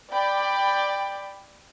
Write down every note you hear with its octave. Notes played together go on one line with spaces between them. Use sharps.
D5 G5 B5